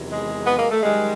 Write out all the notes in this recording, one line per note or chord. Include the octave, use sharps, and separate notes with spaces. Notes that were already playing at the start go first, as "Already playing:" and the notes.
Already playing: E2 C3 D#3 F#3
G#3
B3
A#3
A3
F#2 D#3 G3 G#3